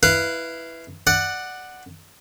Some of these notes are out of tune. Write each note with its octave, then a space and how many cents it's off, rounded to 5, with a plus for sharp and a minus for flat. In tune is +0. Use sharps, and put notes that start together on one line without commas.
E4 +0 B4 +0 F5 -15
D5 +20 F#5 +0